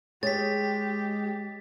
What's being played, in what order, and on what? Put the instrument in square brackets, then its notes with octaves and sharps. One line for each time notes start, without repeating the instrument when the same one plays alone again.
[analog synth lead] G#3 [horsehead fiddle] G4 [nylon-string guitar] C#5 [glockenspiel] A6 B6